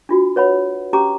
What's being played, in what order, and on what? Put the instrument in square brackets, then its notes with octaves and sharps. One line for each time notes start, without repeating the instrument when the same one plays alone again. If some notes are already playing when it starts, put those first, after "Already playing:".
[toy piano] D4 F4 F#4
B4 C#5 F#5 B5
C#4 G4 A#5 D6